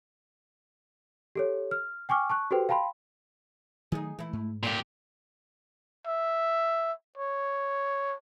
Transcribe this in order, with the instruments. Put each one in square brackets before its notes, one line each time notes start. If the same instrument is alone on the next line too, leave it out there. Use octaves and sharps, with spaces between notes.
[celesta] G4 A4 C#5
F6
G5 G#5 C#6 D6 F6
A5 C#6 F#6
F#4 G4 A4 B4 C5 G5
F5 G5 A5 B5 C6
[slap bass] D#3 F#3 A3 [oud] D#4 G#4
[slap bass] E3 [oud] A3 E4
[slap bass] G#2
[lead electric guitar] A#2 G4 [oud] D3 A3 F4
[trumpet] E5
C#5